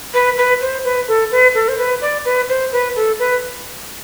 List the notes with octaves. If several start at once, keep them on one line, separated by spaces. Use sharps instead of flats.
B4
B4
C5
B4
A4
B4
A4
C5
B4
D5
B4
C5
B4
A4
B4